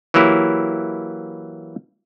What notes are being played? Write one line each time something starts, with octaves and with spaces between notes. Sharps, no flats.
E3 F#3 A#3 E4 G4